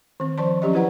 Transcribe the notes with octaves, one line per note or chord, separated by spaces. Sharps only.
D#3 C4
F3 C5 D5 A5 C6
F3 F#3 C#4 G4 D5 D#5
E4 F#4 B4 D5 F#5 A#5